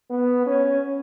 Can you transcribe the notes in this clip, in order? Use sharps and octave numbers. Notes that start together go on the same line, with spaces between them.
B3
C#4